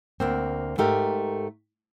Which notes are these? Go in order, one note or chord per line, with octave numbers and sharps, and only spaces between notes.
D2 A#3 C4
G#2 A3 G4 A#4